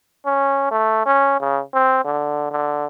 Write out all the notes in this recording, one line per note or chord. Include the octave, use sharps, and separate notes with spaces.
C#4
A3
C#4
C#3
C4
D3
D3